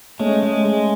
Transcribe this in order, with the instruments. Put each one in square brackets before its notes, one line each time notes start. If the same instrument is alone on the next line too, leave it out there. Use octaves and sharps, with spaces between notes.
[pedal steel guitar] G#3 [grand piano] A3 C#4
[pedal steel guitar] G#3
G#3